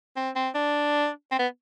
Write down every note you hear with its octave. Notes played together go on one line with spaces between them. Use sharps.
C4
C4
D4
C4
B3